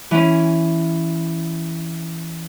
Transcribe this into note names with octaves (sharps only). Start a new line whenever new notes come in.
E3 C#4